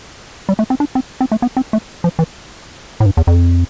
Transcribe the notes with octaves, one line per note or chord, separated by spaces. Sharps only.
G3
A3
C4
D4
C4
C4
A3
B3
C4
A3
F3
E3
A2
G2
E2
F2